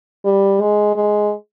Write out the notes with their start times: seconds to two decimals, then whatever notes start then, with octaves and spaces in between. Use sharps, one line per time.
0.25 G3
0.61 G#3
0.95 G#3